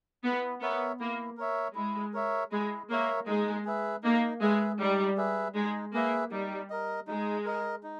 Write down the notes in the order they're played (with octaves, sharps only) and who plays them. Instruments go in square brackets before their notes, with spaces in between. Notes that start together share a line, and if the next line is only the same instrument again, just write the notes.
[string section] B3 [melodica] E4
[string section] B3 [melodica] A#4 C#5 E5
[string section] A#3 [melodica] E4
[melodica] A#4 C#5 E5
[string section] G#3 [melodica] E4
[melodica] A#4 C#5 E5
[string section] G#3 [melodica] E4
[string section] A#3 [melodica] A#4 C#5 E5
[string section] G#3 [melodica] D#4
[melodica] G#4 B4 E5
[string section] A#3 [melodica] D#4
[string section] G#3 [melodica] G#4 B4 E5
[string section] G3 [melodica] D#4
[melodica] G#4 B4 E5
[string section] G#3 [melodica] D#4
[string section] A#3 [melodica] G#4 B4 E5
[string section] G3 [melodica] D#4
[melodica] A#4 D#5
[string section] G#3 [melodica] D#4
[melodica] A#4 D#5
D#4